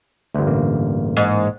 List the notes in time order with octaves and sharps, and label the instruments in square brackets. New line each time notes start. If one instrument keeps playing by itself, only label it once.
[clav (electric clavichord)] G1 D2
[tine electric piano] A1 A#3
[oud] G#2